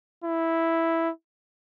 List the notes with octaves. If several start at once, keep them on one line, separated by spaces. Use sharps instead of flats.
E4